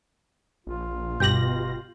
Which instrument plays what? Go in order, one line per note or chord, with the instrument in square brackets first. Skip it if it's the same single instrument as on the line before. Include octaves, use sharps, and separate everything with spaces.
[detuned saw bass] A#1 [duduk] F4
[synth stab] G1 G4 A#6 [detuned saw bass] B2 [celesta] G6 F#7